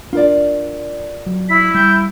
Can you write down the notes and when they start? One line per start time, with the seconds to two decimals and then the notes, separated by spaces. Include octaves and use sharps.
0.13 D4 F4 A#4 D5
1.26 F#3
1.49 E4 B6
1.74 G3 G6